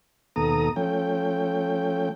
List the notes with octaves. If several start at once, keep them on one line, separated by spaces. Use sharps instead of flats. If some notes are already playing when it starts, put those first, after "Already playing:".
D#2 B2 A4 A#5 D#6
F3 A3 C#4 G5